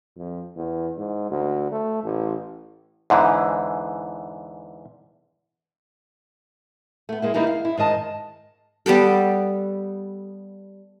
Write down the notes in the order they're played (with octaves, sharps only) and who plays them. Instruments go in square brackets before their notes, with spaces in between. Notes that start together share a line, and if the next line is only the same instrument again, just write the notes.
[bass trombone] F2
E2
G#2
D2
A3
A1
[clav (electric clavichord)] E2 G#2 D3 E3
[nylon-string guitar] A3 B3
G#3 A#3 E4
E3 G3 A#3 D#4 E4
F5
E4
G#2 D#3 D#5 A5
[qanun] G3 B3 G4 A4